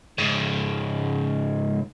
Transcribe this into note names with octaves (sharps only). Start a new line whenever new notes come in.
G#2 C#3